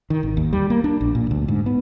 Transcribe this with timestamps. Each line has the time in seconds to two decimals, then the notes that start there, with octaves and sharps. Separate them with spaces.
0.10 D#3
0.23 G#1
0.37 D#2
0.53 G3
0.70 A#3
0.84 D4
1.01 A#1
1.15 A#2
1.31 D2
1.48 G#2
1.66 B3